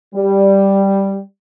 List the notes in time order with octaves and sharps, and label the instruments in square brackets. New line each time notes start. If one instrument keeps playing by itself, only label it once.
[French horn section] G3